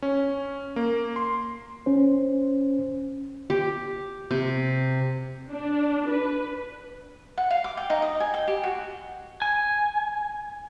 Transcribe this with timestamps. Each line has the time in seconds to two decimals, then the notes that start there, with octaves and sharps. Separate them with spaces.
0.02 C#4
0.76 A#3
1.16 C6
1.86 C#4 C5
3.50 G4
4.31 C3
5.50 D4
6.09 B4
7.38 F#5
7.51 F5
7.64 D6
7.77 G5
7.90 D#4
8.02 D#5
8.20 G#5
8.34 G5
8.48 G4
8.63 F#4
9.42 G#5